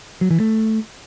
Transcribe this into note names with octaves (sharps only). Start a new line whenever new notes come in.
F#3
E3
A3